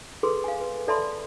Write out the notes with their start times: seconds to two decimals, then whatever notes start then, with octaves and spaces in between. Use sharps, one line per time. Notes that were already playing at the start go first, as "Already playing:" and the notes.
0.23 G#4 A4 B4 C6
0.44 F5 G#5
0.61 B4
0.88 A4 D5 E5 A5 B5 C6